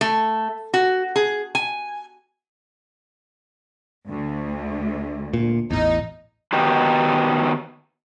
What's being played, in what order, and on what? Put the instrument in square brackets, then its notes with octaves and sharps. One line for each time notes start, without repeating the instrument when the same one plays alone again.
[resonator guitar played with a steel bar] A3
F#4
G#4
G#5
[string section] D2
[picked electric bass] A#2
[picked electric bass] A1 E2 [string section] D#4
[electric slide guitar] D#3 B3 D#4 F#4 G4